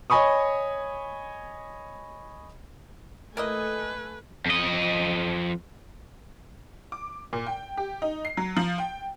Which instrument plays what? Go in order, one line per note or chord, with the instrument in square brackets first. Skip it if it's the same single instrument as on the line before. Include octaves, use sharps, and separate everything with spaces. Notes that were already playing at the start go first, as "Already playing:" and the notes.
[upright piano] C#5 D#5 G#5 B5 C#6 D#6
[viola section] A3 A4 G#5 [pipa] A#3 E4 D#5 [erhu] B4
[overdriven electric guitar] F2 D#5
[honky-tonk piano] D6
A#2
G5
G4
D#4
C7
F#3
F3
G5